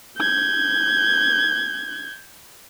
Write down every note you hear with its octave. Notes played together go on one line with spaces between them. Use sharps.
G6 G#6